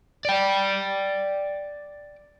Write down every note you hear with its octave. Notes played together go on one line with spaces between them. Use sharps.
D5 G5